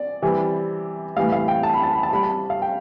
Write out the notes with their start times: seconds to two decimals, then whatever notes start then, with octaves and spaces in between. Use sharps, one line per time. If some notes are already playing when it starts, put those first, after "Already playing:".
Already playing: D5
0.22 C3 E3 G3
1.17 A2 E3 G3 F5
1.32 F5
1.48 G5
1.63 A5
1.74 B5
1.83 A5
1.93 B5
2.03 A5
2.11 C3 G3 B5
2.23 A5
2.50 F5
2.62 G5